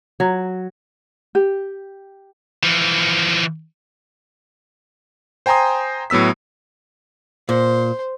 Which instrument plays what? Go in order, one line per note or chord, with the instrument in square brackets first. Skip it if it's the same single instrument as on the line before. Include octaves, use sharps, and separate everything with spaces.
[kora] F#3
[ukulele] G4
[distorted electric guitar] E3 F3
[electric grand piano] C5 G5 G#5 A#5 C6 D#6
A2 F#3 B3 E6 B6
[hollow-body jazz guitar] A#2 [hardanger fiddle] C5